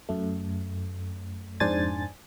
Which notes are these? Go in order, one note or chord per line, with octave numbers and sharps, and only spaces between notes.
F#2 A3
F2 G#2 D4 C5 G#5 A6